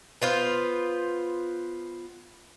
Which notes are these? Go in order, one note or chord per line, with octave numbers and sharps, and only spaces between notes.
B3 F4 C5